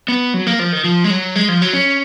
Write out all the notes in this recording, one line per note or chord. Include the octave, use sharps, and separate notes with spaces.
B3
F#3
A#3
F3
D#3
F3
G#3
F#3
G#3
F3
F#3
C#4